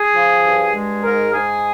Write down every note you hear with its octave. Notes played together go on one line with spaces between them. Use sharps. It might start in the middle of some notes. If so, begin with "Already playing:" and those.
Already playing: G#4
F3
G2
G#3
G#2 A#4
G#2 G#4